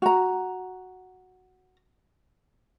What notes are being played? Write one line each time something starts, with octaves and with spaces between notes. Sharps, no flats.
F#4 A#5